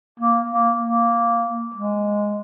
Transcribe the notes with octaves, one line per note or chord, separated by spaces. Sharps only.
A#3
A#3
A#3
G#3